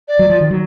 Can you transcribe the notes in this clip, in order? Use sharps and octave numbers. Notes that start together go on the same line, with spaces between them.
D5
F#3
F3
D#3
F#3